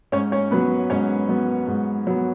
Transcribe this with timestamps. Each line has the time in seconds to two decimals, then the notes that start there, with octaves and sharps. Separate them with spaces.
0.12 G#2 C#4 C#5
0.32 C#4 C#5
0.51 F#3 B3 B4
0.90 G#2 C#4 C#5
1.29 F#3 B3
1.67 G#2
2.07 F#3 B3